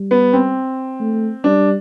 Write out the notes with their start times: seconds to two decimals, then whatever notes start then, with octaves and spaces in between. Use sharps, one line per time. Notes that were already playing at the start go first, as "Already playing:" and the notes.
Already playing: G3
0.11 B3
0.33 C4
1.00 A3
1.44 G3 D4